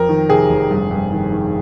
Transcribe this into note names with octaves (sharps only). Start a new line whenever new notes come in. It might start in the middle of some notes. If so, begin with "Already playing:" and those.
Already playing: F2 A#4
D#3
C3 G#4
F1
G2
G2
D#3
D#3